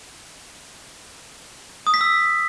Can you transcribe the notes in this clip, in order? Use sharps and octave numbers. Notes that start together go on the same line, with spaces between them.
D#6
B6
E6